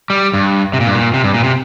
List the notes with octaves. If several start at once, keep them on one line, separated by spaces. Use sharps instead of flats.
G3
G2
C3
A#2
G2
A#2
C3
G2
A#2
C3